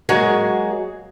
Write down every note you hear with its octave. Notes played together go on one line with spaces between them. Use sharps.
F#3 G#3 A#3 F#4 G#4